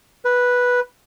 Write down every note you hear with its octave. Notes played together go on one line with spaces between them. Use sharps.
B4